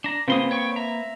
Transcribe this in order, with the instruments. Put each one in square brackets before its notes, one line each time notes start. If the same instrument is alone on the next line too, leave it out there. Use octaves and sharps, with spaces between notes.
[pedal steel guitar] D4 A#5
[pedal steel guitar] C#3 C6 D#6 [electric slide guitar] A#3 B4 [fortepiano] C4 F4
[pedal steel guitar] C#5 G5 C#6
E5 A#5